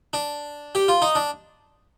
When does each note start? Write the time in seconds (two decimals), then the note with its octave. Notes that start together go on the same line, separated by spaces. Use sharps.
0.13 D4
0.75 G4
0.88 F4
1.02 D#4
1.15 D4